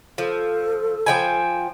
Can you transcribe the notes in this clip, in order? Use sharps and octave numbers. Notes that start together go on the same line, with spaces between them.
F3 A4
F3 G5 G#5